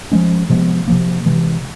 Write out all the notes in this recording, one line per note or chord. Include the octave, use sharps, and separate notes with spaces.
F3 G#3 C#4
C3 F3 G#3 B3
C3 F3 A#3
C3 E3 G#3